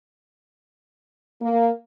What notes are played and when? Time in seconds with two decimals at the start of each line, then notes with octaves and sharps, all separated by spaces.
1.41 A#3